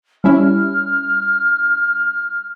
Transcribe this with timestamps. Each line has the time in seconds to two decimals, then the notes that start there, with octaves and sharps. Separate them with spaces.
0.24 G3 C#4 E4 F6